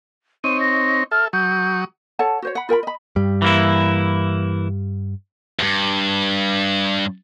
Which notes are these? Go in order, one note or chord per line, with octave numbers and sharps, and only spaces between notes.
C4 D#4 C#5 D#7
A#6
A4 E5 F6
F#3 C#6 D#6 G6
A4 C#5 F#5 A5
F#4 C5 C#5
F#5 B5
F4 A#4 G5 B5
D#5 B5
G2 G3
E3 A#3 E4
E2 G2